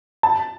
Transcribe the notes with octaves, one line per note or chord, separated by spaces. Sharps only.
A5